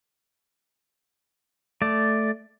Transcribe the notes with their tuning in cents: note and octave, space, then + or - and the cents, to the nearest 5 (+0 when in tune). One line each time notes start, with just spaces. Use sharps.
A3 +0 D5 +0